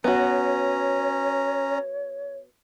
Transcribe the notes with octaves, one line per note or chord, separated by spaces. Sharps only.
B3 C#4 F#4 C#5 A#5